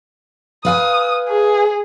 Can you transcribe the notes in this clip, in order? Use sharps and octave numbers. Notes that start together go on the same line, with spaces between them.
B4 F5 G#5 D#6
G#4